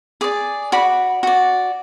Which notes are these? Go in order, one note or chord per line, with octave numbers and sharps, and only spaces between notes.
G#4 D5 D6
F#4 D5 B5
F#4 D5